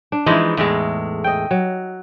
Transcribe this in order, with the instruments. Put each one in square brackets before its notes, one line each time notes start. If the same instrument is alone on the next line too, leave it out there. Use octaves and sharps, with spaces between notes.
[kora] D4
[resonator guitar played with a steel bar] E3 F3 G#3 [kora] D#4 E4
[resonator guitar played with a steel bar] E2 A2 G#3
[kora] D#5 G5
F#3